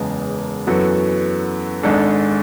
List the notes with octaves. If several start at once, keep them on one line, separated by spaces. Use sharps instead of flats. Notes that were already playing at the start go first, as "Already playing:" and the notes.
Already playing: F#1 E2 C#3 G#3 B3
F#2 E3 B3 F#4 A4
G#1 G#2 G#3 D4 A4